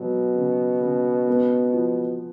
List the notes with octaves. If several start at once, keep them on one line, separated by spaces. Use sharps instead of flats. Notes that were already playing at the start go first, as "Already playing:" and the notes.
Already playing: B2 F#3
C#3
C#3
B3
F3